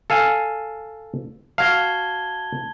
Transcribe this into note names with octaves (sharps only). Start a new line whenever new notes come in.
A4 F5 G#5
F#4 F5 A5 G#6 G7